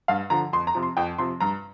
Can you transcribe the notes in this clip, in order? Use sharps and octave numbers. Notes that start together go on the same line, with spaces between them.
G2 F5
D3 F3 A#5
F2 C6
A#5
C3 F3
C6
F2 G5
C3 F3 C6
G2 A#5